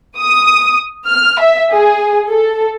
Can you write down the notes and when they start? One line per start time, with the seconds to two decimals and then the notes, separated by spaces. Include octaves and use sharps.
0.18 D#6
1.07 F6
1.40 E5
1.73 G#4
2.28 A4